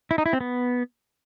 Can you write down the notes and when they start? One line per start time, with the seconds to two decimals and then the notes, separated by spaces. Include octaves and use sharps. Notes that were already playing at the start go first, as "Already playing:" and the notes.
0.11 E4
0.18 D#4
0.26 E4
0.33 C4
0.41 B3